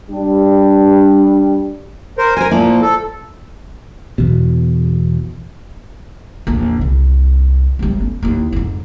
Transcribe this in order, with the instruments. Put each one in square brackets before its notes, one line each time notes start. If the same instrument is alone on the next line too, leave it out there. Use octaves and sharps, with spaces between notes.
[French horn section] G3 D4
[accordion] A#4 C5
[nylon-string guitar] A#4 C5 [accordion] G#5
[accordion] A#2 F3 [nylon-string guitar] A#3 E4
[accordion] A4
[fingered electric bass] E2 B2
[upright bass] A#1 E2
C2
G1 G3
C#4
D#2 E4
F2 G#2